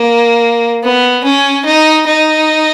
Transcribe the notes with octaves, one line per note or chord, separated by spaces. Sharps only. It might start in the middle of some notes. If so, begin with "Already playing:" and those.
Already playing: A#3
B3
C#4
D#4
D#4